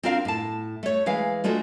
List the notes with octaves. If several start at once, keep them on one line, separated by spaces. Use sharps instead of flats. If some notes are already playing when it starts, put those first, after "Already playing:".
C4 D4 F4 A#4 F5
A2 A5
A3 C#5
E3 G#3 F5
G#3 A3 D4 F4 F#4